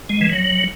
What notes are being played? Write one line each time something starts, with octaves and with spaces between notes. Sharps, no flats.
G#3
E3
F#3